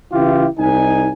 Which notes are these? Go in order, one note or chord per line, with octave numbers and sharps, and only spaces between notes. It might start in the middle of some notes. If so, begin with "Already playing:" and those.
C#3 E3 E4 F4 G4
C2 D#4 G#5